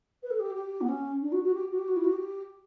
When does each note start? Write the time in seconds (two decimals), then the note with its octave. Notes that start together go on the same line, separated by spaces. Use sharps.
0.23 B4
0.30 A4
0.39 G4
0.55 G4
0.81 B3
0.88 C#4
1.22 D4
1.32 F#4
1.44 F#4
1.54 G4
1.71 F#4
1.79 G4
1.88 F#4
1.96 E4
2.04 F#4
2.13 G4